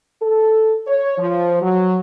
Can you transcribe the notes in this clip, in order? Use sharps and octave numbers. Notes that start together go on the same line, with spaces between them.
A4
C#5
F3
F#3